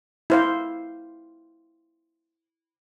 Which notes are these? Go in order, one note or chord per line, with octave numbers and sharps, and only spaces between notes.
E4 C5 F5